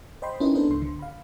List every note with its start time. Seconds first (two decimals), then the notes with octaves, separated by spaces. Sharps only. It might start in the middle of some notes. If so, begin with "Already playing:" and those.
0.22 C5 D#5 G5 B5 C6
0.40 C#4 D#4 E4 A#4 B4 D#5
0.55 A#3 B3 D4 A4 B4 C5
0.69 C#2 G#2 C6
0.82 D3
0.99 F5 B5